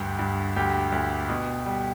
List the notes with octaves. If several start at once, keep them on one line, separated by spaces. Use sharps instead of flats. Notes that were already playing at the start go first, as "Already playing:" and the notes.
Already playing: D2 G2 G4
G2
D2 G4
D2
B2
G3